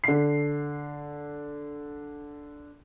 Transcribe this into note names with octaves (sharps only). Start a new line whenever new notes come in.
D3 C7